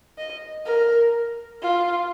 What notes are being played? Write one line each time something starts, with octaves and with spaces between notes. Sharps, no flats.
D#5
A#4
F4